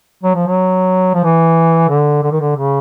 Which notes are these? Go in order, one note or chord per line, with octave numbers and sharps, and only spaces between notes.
F#3
F3
F#3
F3
E3
D3
D3
D#3
D3
C#3